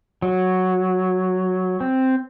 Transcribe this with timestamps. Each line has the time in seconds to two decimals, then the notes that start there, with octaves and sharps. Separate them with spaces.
0.22 F#3
1.80 C4